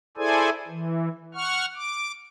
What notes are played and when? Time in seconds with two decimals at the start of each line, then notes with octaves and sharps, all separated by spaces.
0.17 E4 G#4 A4 C5 D5 G#5
0.68 E3
1.35 F#5 C#6 F6
1.76 D6